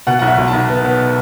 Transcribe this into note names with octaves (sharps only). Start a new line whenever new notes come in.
B2 F#5
B1 F#5
E5
B1
A5
B1
B3
B3